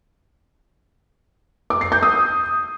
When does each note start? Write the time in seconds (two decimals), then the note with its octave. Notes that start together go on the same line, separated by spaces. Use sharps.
1.70 D6
1.81 C7
1.92 G6
2.03 D#6